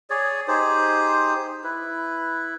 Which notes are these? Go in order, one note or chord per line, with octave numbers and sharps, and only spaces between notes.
G#4 C#5 D5
D#4 G4 G#4 C5
E4 B4